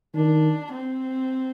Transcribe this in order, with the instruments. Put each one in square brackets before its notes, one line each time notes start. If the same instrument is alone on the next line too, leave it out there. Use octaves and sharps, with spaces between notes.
[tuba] D#3 [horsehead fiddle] D4
[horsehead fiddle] C4